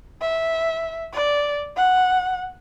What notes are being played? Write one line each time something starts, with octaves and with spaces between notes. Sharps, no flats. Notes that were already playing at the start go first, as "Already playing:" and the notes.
E5
D5
F#5